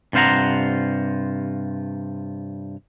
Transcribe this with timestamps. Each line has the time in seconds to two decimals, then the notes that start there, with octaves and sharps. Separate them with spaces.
0.13 G2 C3 F4 C5 F#5 A#5